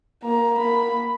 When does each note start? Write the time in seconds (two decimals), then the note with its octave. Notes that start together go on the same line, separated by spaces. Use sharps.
0.23 A#3 A#5
0.58 A#3 B5